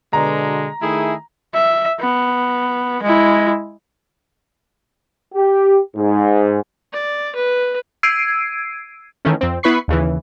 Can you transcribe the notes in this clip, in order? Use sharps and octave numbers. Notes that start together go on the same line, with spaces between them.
B2 D3 G#3 A#5
D#3 A3 E4 G#4
E5
B3
G#3 E4
G4
G#2
D5
B4
E6 G#6 C7 D7 D#7
D#3 E3 A3 C#4
F2 C4
B3 E4 B4 B5 C#6 C7
D#2 C#3 E3